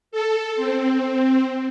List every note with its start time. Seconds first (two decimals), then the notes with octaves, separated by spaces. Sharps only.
0.11 A4
0.56 C4